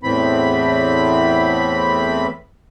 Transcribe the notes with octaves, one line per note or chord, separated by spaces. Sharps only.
E2 A2 E3 C4 B5